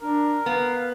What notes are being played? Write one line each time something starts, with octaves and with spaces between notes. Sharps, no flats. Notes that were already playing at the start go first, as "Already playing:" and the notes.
D4 A#4
B3 F5